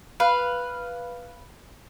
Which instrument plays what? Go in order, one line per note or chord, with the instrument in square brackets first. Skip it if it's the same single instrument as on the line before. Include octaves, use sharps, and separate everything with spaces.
[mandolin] B4 F5